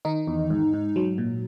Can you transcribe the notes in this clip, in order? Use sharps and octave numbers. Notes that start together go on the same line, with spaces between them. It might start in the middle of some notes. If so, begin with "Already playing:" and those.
D#3 D#4
E2
G#2
G#2
F#3
A#2